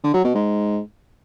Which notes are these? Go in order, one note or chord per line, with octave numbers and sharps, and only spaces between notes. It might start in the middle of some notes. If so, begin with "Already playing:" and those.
D3
F#3
B2
G#2